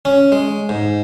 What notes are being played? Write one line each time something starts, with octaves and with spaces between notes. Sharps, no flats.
C#4
G#3
G#2